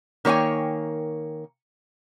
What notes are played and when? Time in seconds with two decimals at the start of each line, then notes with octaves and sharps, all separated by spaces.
0.25 D#3 A#3 C#5 G5 G#5